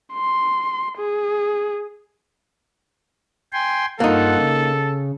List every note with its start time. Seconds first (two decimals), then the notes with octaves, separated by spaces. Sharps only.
0.13 C6
0.98 G#4
3.53 G5 G#5 C6
4.00 G2 A#3 D#4 F4 A4 F#5
4.36 C#3